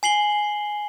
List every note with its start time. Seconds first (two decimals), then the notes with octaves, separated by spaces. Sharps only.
0.03 G#5 C7 F#7 G7